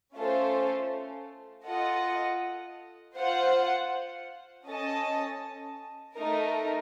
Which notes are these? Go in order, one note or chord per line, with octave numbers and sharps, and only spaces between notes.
A3 C#4 F4 A4 C5
F4 A4 D#5 F#5
F4 C5 F#5
C#4 A4 D#5 A5
A3 D#4 A#4